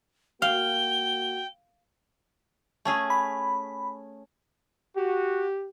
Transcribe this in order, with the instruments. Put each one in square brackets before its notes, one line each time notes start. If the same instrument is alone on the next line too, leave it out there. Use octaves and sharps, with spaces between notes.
[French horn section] A#3 F#4 [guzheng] F5 [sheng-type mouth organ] G5 [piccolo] G7
[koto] A3 C#4 G#4
[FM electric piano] B5
[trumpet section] F#4 [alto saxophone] G4